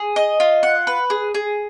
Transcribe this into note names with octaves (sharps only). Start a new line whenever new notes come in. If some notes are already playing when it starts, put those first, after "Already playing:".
Already playing: G#4
D#5
F4
F#5
B4
G#4
G#4